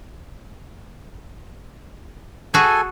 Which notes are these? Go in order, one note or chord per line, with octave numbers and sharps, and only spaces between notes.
F#4 G#4 A4 G#5